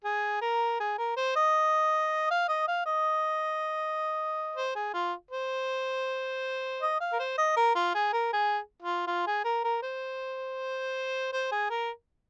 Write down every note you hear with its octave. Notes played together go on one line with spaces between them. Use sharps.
G#4
A#4
G#4
A#4
C5
D#5
F5
D#5
F5
D#5
C5
G#4
F4
C5
D#5
F5
A#4
C5
D#5
A#4
F4
G#4
A#4
G#4
F4
F4
G#4
A#4
A#4
C5
C5
G#4
A#4